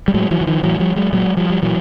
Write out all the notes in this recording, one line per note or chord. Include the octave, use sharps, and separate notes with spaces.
G3
A2 F#3 G#3
E3 F#3
E3
D#3 F3
A2 E3 F#3
F3 G3
F#3 G#3
A#2 F#3 G#3
F3 G3
G3
A#2 E3 F#3